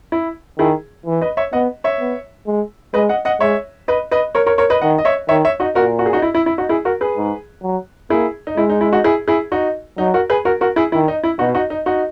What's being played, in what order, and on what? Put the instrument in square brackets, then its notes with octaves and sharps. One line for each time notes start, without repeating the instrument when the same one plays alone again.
[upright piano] E4
[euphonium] D#3 [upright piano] E4 G#4
[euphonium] E3
[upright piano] B4 D#5
C#5 E5
[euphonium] B3 [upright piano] D#5 F#5
[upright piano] C#5 E5
[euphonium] B3
G#3
[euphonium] G#3 [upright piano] B4 D#5
[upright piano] D#5 F#5
D#5 F#5
[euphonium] G#3 [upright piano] C#5 E5
[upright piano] B4 D#5
B4 D#5
A#4 C#5
A#4 C#5
A#4 C#5
B4 D#5
[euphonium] D#3 [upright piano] D#5 F#5
[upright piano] D#5
C#5 E5
[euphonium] D#3 [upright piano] C#5 E5
[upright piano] C#5 E5
D#4 F#4
[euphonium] A#2 [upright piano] F#4 A#4
[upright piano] F#4
G#4
D#4 F#4
E4
E4
E4
D#4 F#4
E4 G#4
F#4 A#4
G#4 B4
[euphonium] G#2
F#3
[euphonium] A#3 [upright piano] E4 G#4
[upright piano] D#4
[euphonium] G#3 [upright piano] E4
[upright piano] D#4
E4
D#4 F#4
E4 G#4
E4 G#4
D#4 F#4
[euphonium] F#3 [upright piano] D#4
[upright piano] F#4 A#4
G#4 B4
F#4 A#4
F#4 A#4
E4 G#4
[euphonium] D#3 [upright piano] E4
[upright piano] D#4
E4
[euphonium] B2 [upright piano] D#4 F#4
[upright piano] D#4 F#4
D#4
D#4 F#4